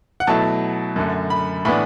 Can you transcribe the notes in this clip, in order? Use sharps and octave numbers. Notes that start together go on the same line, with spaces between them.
F#5
B2 F#3 A3 E4 A5
F#2 D3 A3
B5
A2 E3 B3 D4 B5